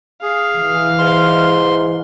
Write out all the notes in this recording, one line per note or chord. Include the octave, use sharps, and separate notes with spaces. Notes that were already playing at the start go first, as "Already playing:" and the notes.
G#4 F5
E3
G#2 C6